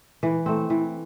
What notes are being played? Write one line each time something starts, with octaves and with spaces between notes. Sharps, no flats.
E3
A3 C4
E3